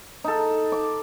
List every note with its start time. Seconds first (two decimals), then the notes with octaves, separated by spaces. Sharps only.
0.24 D#4 A4
0.72 D6